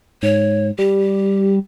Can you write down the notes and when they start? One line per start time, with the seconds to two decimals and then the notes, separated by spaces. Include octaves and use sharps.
0.23 G#2 C#5
0.79 G3 G4